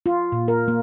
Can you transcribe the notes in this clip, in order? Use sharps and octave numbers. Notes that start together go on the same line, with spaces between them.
F4
A#2
A#4
A#3